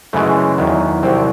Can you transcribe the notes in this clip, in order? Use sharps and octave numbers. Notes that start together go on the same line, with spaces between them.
F#2 C#3 E3 G#3 A3
E2 D#3 F#3
C2 C3 F#3 C4